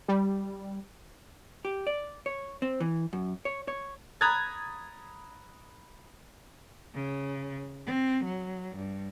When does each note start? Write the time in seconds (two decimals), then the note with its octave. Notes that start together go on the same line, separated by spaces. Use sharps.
0.08 G3
1.65 G4
1.87 D5
2.26 C#5
2.62 C4
2.80 E3
3.13 F#2
3.45 C#5
3.68 C#5
4.21 A#5 B5 D#6 F#6 G#6 A6
6.94 C#3
7.86 C4
8.24 F#3
8.76 G2